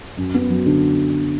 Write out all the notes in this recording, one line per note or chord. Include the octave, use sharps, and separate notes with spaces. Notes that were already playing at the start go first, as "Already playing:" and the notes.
F#2
B3
F#3
D3